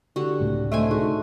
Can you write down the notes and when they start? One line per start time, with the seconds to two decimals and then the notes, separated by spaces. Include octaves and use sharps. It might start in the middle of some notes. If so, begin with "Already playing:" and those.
0.16 D3 F#4 G4
0.40 C#2 A2 C3
0.72 A3 C5 D#5 E5 G#5
0.91 D#4 F#4 G#4